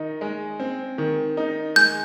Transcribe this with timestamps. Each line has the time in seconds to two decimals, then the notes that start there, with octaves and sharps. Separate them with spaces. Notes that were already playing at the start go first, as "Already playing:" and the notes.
Already playing: D#3 D#4
0.21 G#3
0.60 C4
0.98 D#3
1.37 D#4
1.76 G#3 G6